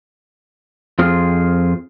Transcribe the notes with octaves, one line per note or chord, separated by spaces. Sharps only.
F2 C4 F4 G#4